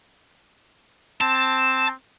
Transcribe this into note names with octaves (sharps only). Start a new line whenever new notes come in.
C4 A5